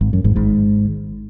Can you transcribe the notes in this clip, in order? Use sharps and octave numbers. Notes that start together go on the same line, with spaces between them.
G#1 G#2
F#2
G#1 G#2
G#1 G#2